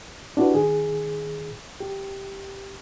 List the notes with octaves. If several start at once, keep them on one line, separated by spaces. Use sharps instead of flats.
D4 E4 F#4 G4 B4
D#3 G#4
G4